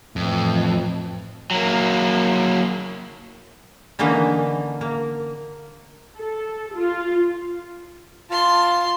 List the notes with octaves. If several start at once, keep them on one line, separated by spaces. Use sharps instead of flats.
F2 A2 E3
F#3 A#3
D3 E3 A#3 C#4 D#4
A#3
A4
F4
F4 A5 C6